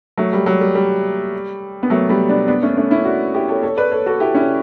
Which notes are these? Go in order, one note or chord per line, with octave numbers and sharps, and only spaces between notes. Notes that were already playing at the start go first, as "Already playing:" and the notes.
F#3 A3
G3
F#3
G3
G3
B3
F#3 A3
G3 B3
B3 D4
B3 D4
A3 C#4
A3 C#4
C#4 E4
D4 F#4
E4 G4
A4 C#5
A4 C#5
B4 D5
A4 C#5
F#4 A4
E4 G4
C#4 E4